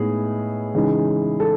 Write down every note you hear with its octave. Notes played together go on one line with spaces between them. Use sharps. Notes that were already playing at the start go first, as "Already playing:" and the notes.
Already playing: A2 G#3 B3 D#4 G#4
C#3 E3 G#3 D#4
A4